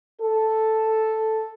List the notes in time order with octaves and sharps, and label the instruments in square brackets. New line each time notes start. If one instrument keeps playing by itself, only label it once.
[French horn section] A4